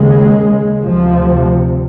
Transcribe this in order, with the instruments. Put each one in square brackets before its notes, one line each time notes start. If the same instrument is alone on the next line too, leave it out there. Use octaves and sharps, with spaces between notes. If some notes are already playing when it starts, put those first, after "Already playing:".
Already playing: [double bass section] D#2 C#3 G#3
D2 C3 F3